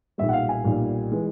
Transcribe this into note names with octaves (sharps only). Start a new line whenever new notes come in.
B1 A#2 G3 E5
F#5
F5
G#5
B1 A#2 G3
E3 G#3